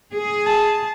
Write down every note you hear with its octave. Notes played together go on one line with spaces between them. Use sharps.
G#4
A5